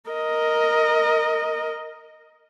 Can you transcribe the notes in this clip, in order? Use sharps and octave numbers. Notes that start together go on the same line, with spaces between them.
A#4 D#5